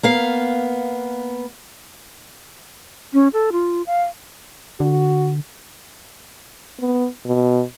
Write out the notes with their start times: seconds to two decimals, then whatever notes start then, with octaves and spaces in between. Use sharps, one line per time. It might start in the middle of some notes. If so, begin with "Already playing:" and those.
0.03 A#3 B3 F5
3.13 C#4
3.33 A4
3.52 F4
3.86 F5
4.80 D3 F#4
6.80 B3
7.25 B2